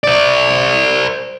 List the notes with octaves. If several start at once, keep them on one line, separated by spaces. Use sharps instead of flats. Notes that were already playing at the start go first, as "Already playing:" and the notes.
C5 D5